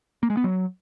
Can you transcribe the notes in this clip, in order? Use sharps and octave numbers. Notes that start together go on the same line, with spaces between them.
A#3
G#3
B3
F#3